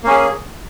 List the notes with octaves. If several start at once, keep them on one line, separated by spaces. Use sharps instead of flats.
A#3 C#4 G#4